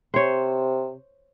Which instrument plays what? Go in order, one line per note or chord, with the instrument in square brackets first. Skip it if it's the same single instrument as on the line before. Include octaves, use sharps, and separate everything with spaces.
[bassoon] C3 [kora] C5 C#5